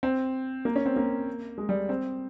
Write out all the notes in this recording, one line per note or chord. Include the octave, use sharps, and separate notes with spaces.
C4
A#3
C#4
C4
A#3
G#3
G3
C4